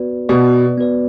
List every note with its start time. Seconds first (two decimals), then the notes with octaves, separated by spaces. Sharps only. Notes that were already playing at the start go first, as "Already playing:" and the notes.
Already playing: B3 F#4 B4 D5
0.29 B2 B3 F#4 B4 D5
0.78 B3 F#4 B4 D5